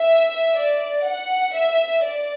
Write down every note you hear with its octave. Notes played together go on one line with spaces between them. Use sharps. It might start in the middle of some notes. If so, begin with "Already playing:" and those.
Already playing: E5
D5
F#5
E5
D5